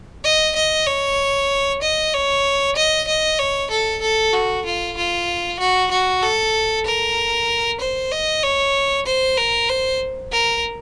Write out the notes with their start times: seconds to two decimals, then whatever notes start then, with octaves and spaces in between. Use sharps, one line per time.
0.24 D#5
0.56 D#5
0.87 C#5
1.82 D#5
2.13 C#5
2.76 D#5
3.07 D#5
3.39 C#5
3.71 A4
4.02 A4
4.33 F#4
4.65 F4
4.97 F4
5.59 F#4
5.91 F#4
6.22 A4
6.86 A#4
7.80 C5
8.11 D#5
8.43 C#5
9.06 C5
9.37 A#4
9.69 C5
10.32 A#4